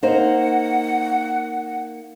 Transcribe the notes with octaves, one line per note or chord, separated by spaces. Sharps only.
A#3 D#4 C5 F#5